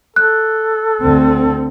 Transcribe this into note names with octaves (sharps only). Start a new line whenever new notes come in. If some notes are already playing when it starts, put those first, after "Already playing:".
A4 F#6
D2 D3 C4